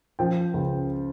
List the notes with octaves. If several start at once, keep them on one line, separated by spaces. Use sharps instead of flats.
F3 G5
C#2